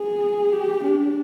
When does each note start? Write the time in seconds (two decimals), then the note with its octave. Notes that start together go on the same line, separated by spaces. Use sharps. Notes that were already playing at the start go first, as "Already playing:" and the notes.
Already playing: G#4
0.53 G4
0.84 D4